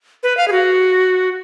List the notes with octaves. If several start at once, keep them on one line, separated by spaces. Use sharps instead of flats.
B4
F5
G#4
F#4